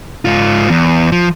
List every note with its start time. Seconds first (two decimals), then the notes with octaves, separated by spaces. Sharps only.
0.25 G#2 F4
0.69 E2
1.12 F3